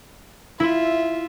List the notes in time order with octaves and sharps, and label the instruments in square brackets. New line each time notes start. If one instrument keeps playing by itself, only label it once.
[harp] E4 [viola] F4 E5